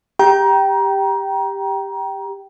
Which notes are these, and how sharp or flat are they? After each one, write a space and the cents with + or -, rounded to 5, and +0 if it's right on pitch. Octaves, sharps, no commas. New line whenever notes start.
G4 +10 G5 -15 A#5 +25